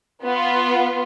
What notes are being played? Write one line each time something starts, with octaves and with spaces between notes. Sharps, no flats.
B3 F4